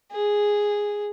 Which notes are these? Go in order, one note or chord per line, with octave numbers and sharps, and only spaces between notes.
G#4